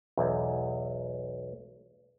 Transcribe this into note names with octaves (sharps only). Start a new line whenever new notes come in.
B1 E2